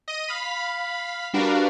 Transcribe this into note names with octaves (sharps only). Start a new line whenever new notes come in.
D#5 D#7
F5 B5
G3 D4 F#4 A#4 B4 F5